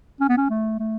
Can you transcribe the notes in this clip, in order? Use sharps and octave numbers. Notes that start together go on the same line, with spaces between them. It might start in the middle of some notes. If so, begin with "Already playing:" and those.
C#4
B3
C#4
A3
A3